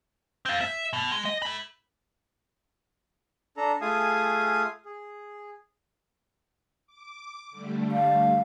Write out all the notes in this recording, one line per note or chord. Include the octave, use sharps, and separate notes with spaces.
C4 F4
E5
B2
G#3
D#5
A4 B5
D4 A4 A#5
A3 F4 G#4 F5 G#5 D#6
G#4
D6
D3 G3 A3
F5